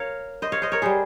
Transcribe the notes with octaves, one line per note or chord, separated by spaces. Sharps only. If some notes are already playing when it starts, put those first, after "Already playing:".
Already playing: A#4 C#5 F5
C5 D#5
C#5 F5
C5 D#5
A#4 C#5
G3 G#4 C5